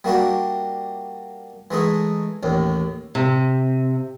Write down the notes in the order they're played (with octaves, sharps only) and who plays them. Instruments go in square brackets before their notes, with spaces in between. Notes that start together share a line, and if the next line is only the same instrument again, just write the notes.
[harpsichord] G3 A#3 D4 F#4 G4
E3 G#3 A3 D#4
A1 D#2 A2
[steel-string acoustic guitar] C3